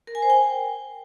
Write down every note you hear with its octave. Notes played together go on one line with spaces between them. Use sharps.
A#4
G#5
C5
G5